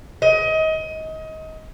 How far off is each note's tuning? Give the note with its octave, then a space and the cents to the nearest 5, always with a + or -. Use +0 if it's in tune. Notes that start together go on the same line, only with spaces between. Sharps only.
D#5 +25